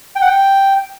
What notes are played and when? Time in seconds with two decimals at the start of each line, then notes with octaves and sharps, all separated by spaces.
0.16 G5
0.21 F#5
0.27 G5